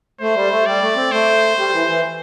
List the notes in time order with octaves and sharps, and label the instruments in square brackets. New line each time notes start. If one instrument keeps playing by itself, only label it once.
[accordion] A3 [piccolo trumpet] C5
[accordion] G3
A3
[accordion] G3 [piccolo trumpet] D5
[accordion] A3
C4
[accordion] A3 [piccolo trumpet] C5
[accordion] G3
E3
E3